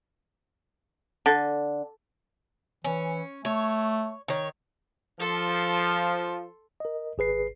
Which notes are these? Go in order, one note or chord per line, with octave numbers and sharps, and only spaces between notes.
D3
E3 C#4
A3 C#5
D#3 C#5
F3 A4 C6
A#4 D#5
G#1 G#4 B4 C7